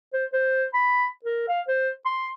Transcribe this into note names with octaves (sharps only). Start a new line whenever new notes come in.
C5
C5
B5
A#4
F5
C5
C6